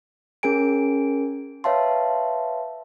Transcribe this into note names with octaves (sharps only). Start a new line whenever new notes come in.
C#4 G#4 A#4 G#5 D7
B4 C#5 E5 F5 A5 C6